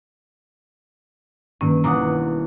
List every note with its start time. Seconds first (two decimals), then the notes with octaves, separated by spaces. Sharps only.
1.61 G2 D#3 A#3 C#4
1.84 E1 F#5 A#5 D6 D#6